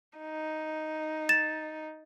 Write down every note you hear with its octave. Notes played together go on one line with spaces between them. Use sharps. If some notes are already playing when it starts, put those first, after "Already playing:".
D#4
A6 E7